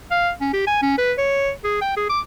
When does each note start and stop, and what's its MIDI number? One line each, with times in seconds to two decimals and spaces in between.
0.11 0.31 77
0.41 0.51 61
0.53 0.65 67
0.67 0.79 80
0.82 0.96 61
0.98 1.13 71
1.18 1.51 73
1.64 1.80 68
1.81 1.96 79
1.97 2.05 68
2.09 2.20 86